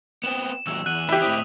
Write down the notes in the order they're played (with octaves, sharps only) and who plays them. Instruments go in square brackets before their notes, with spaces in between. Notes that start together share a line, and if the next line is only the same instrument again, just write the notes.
[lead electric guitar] B3 C4 [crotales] E7
[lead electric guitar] D#2 F#3 [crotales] E6
[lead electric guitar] E2 [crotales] F#6 D#7 F#7
[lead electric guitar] E3 [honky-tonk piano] E4 G4
[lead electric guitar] A2 C4 [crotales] D#6